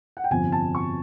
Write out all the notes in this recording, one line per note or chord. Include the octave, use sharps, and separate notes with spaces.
F#5
G5
G1 F2 C3 F3 G#5
A5
C#6